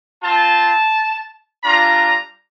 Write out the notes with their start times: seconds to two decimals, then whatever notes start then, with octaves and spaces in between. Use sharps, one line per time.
0.23 C4 F4 A5
1.64 G3 D4 F4 A#5